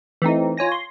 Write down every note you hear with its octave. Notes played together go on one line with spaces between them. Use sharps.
E3 A3 C4 D#4
F4 C#5 G#5 A#6
C6